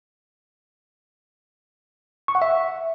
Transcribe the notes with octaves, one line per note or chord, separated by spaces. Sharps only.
C#6
F#5
E5